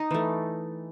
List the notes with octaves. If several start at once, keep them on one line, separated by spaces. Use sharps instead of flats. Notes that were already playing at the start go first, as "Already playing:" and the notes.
Already playing: D#4
E3 A3